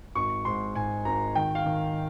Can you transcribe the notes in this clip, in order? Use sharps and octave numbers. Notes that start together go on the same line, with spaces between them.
G#1 C#6
G#2 C6
G#2 G#5
G#1 A#5
D#3 G5
F5
D#3